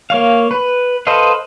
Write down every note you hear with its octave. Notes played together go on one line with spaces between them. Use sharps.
A#3 C#5 F5
B4
A4 B4 C5 D#5 F5